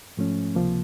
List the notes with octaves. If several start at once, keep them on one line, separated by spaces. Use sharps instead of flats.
G#2 F3 A3 C#4
C#2 C3 F3 A#3